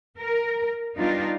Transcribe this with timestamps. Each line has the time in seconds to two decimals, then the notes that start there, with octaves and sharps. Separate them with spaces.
0.18 A#4
0.97 G3 B3 D4 D#4 F4